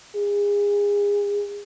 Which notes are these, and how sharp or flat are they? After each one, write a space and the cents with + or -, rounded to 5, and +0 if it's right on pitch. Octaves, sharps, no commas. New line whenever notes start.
G#4 -30